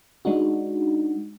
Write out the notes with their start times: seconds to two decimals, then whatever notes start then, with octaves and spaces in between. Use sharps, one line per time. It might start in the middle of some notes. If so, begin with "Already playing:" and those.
0.25 G#3 D4 D#4 F#4